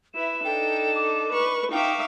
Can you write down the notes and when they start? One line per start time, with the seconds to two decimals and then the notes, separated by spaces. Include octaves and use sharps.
0.14 E4 B4 E5 E7
0.45 D4 D#4 A4 G5
0.95 D6
1.32 B4 C#6
1.72 D#4 E5 F5 G5 C#6 D6